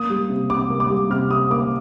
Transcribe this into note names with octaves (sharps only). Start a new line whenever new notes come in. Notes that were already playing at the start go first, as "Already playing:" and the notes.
Already playing: A#3 D#6
G3
C3
C3 D6
A#3
D6
G3
C3 F6
C3 D#6
A#3 D6